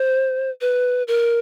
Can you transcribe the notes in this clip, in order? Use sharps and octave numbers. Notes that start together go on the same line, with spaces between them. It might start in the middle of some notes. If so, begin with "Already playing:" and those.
Already playing: C5
B4
A#4